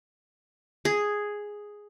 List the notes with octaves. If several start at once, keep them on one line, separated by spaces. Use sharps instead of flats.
G#4